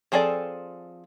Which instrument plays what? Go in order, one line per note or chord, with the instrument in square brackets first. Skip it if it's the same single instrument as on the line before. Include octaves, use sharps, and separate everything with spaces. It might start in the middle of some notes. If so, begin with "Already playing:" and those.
[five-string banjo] F3 C4 G#4 A4 D5